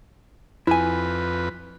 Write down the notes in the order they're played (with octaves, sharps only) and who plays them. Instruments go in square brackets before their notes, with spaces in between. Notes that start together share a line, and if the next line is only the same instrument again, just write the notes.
[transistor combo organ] F2 B4 [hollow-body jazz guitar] E4 G#5